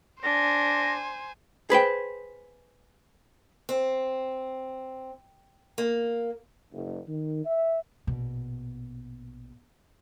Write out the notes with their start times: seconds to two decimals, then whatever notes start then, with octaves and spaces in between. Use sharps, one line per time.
0.23 D4 C5 G#5 A#6
1.70 G#4 B4 C5 G5
3.69 C4
5.78 A#3
6.72 F#1
7.07 D#3
7.45 E5
8.07 A#1 B2